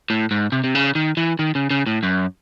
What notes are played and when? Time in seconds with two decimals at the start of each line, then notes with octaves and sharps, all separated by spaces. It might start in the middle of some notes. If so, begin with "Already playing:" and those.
0.10 A2
0.31 G#2
0.52 C3
0.64 C3
0.75 C#3
0.95 D#3
1.17 E3
1.39 D#3
1.55 C#3
1.70 C#3
1.86 A2
2.03 F#2